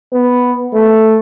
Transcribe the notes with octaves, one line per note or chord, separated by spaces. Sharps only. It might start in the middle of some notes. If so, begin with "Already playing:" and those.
B3
A3